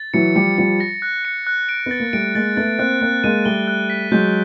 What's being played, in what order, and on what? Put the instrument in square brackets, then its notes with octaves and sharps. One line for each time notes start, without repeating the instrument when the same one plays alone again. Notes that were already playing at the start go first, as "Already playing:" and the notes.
Already playing: [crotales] A6
[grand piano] E3 F#3 [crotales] C#7
[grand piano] F3 G3 [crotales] C#7
[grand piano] F3 G3 [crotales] C#7
[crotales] A#6
F#6
C#7
F#6
D7
[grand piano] B3 [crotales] A6
[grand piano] A#3
[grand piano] G3 A3 [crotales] D7
[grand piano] G#3 A#3 [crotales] A6
[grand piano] A3 B3 [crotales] A6
[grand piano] A#3 C4 [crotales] F#6
[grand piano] A#3 C4 [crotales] F#6
[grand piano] G#3 A#3 [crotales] D#7
[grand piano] G3 A3 [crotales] G7
[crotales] F#6
B6
[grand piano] F#3 G#3 [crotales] G6